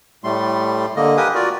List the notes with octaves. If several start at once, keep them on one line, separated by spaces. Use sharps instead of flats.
A2 G3 A3 C6
D3 A#3 D#5
G4 A#4 B4 G#5 D#6
F4 F#4 A#4 D5